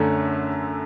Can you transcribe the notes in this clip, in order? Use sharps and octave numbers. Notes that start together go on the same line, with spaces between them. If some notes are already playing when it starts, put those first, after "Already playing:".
Already playing: F#2 D3 A3